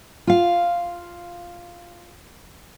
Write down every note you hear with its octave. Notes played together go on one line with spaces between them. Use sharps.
F4 F5